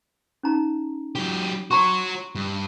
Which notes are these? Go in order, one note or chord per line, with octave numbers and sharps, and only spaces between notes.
C#4 D#4 A#5
F#3 G4
F#4 C#5 A#5 C6 C#6
G2